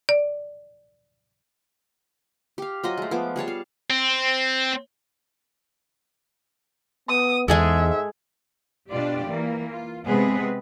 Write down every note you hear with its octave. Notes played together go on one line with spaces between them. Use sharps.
D5
G4 F5
F#3 F4 C5 D#5
G#3 A3
F3 B3 D6
G3 G#4 C#5 A5
F5
C4
B3 D#6
E2 G#2 G#3 G#4 A4 E5
B2 D4 F4 G4 D5
E3 A#3
F4
C3 G#3 B3 C4 G#4 B4